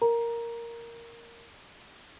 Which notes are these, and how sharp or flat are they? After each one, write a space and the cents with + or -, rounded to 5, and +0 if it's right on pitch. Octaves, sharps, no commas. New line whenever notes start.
A#4 +0 A#5 +10